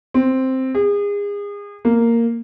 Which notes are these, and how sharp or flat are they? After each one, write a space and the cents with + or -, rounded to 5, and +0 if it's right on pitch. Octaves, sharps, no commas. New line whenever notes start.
C4 +0
G#4 -35
A#3 -10